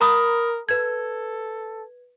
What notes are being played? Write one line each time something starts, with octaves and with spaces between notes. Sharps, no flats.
A#4 A#5 B5 D#6
A4 B4 G#6